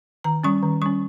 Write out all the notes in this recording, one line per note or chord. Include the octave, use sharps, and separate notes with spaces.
D#3 A#5
G3 C#4 C#6
D#3
G3 C#4 C#6